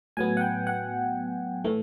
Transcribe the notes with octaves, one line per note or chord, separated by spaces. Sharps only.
A2 F#3 B3 G#5
F#5
G5
F#5
A2 E3 A3